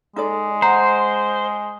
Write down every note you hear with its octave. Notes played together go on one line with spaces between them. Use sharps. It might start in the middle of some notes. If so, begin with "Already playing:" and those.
G#3 D#4 A4 D5
C5 F#5 A#5